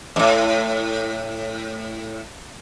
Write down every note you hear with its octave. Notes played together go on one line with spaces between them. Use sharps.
D#2 A2